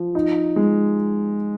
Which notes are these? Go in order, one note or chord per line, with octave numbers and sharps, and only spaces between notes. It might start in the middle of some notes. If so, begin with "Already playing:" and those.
Already playing: F3
D#4
G#3